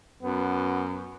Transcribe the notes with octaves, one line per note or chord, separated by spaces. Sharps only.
F#2 B3